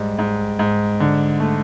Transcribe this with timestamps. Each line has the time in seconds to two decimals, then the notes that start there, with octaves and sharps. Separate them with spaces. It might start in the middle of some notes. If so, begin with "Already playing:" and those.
Already playing: G#2 G3
0.19 G#2
0.59 G#2
1.00 D3
1.40 A3